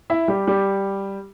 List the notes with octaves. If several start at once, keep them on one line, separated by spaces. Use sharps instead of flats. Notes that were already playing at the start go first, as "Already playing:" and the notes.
E4 E5
G3 G4
G3 G4